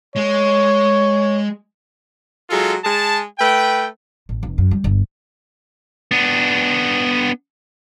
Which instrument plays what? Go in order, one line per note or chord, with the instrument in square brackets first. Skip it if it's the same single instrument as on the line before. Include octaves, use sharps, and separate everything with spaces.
[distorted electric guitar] G#3 [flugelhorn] C#5
[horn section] F#3 G#3 F4 A4
G#3 G#4 A5
A3 B4 G5
[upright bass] A1
F1
F#2
G3
G1
[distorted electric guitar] B3 D4